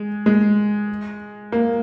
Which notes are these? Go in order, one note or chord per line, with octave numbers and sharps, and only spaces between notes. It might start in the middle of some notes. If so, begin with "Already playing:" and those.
Already playing: G#3
G#3
A#3